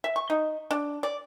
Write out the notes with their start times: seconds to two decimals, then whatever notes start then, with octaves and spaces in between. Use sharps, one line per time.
0.04 E5
0.16 C#6
0.30 D#4
0.71 D4
1.03 D5